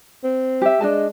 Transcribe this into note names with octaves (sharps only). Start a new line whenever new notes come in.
C4
G4 E5
G#3 D4 D#5 A5